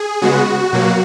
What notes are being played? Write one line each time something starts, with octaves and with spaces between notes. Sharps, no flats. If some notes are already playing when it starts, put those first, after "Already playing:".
Already playing: G#4
C#3 G#3 B3 F#4
B2 F#3 A#3